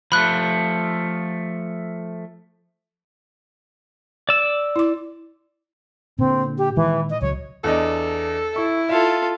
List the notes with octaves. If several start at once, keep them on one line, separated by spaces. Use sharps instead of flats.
F3 A3 B5 F#6
D5 E6
E4 D6
A#2 D3 C4
G4
A#2 D#3 E3 G#3
D#5
C#2 F#3 C#5
E2 D4 A4 D#5
E4 C#6
F4 A4 E5